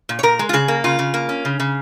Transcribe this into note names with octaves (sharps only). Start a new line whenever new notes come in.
A#2
C#5
A#2 A#4
G#3
F4
C#3 G#4
A#3
C#3 F4
C#3
A#3
C#4
C#3
C#3